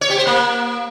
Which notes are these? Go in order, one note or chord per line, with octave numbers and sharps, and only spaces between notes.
C#5
G4
C5
A#3